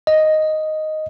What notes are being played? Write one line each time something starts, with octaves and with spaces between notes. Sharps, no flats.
D#5